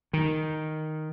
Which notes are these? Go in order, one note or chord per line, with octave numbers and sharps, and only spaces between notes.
D#3